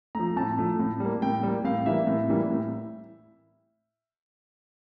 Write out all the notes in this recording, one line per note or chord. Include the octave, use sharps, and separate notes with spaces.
F3 A3 A#5
A2 A5
F3 A3
A2
G3 A#3
A2 G5
G3 A#3
A2 F5
E3 G3 A#3 E5
A2
E3 G3 A#3
A2